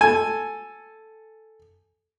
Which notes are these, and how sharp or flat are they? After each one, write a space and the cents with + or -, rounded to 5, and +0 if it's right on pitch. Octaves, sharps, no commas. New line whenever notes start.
A4 +0 G#5 +0